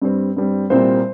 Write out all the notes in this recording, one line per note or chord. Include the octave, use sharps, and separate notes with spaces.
G2 G3 C4
G2 G3 C4
C2 A#2 G3 C4 C5